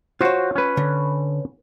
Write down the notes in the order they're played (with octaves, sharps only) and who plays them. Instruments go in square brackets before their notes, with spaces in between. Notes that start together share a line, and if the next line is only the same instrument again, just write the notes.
[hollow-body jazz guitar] F4 C#5 [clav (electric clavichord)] F#4 C5
[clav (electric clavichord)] C#4 B4
[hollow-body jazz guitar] D3